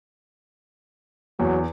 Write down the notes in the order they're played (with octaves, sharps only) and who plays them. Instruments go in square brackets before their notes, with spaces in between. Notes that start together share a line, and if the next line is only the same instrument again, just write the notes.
[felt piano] E2 [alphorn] F#3